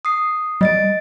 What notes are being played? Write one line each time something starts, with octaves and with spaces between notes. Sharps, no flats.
D#6 C7
G3 D#5 A6 D7